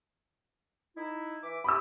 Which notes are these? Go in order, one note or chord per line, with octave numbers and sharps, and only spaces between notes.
D#4 E4
E3 E5 D6
F#4 G4 B5 D#6 E6